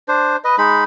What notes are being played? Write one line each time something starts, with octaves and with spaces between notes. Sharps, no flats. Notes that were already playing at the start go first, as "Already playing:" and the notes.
D4 C5
B4 D#5
G#3 D#4 B5